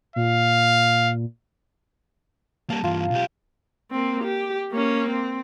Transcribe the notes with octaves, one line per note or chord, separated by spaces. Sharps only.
A#2 F5
G3 A#3 A5 A#5
G2 E3 F4
B1 G4
A#3 C4
G4
A#3 C#4
C4